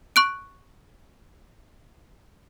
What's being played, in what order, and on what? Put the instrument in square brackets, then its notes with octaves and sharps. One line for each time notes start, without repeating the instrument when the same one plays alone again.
[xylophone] C#6 F#6 D7